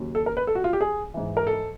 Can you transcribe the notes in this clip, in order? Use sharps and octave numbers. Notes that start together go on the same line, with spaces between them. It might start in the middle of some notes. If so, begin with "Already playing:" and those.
Already playing: D#2 C#3 F#3
A4
A#4
B4
A4
F#4
F4
G4
G#4
G#2 E3
A#4
A4